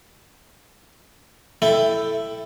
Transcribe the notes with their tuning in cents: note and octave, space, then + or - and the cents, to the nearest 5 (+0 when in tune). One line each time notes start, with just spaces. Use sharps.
E4 +10 A4 +0 G5 +0